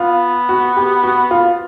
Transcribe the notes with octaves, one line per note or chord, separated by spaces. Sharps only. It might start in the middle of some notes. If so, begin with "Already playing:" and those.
Already playing: B3 F4
F#4
G4
F#4
F4